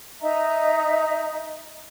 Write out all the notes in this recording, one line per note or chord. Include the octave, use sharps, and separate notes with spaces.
D#4 D#5 E5 A#5